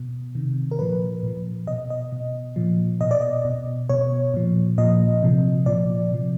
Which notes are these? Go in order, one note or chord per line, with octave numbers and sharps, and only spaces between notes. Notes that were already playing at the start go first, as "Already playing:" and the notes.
Already playing: B2
C3 D#3
A#4
A#2 F3 B4
A#2 F3
B2 D#5
D#5
B2
A#2 F3
B2 D#5
D5
D#5
B2
B2 C#5
A#2 F3
A#2 F3 D#5
C3 F3
A#2 F3 D5
C3 F3